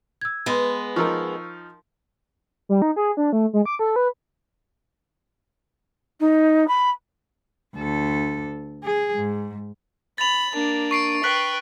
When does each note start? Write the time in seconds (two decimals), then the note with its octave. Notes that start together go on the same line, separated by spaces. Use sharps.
0.21 E6 G#6
0.46 G#3 B3 B4 C6
0.96 F3 D#4 A#4 C#6 E6
2.69 G3
2.82 D#4
2.96 G#4
3.17 D4
3.33 A3
3.53 G#3
3.65 D6
3.79 A4
3.96 B4
6.20 D#4
6.68 B5
7.76 D2 A4
8.84 G#4
9.15 G#2
10.18 B5 A6 F7
10.53 A#3 D4
10.91 C#6 C7 D7
11.23 B4 G5 F#6 B6 F#7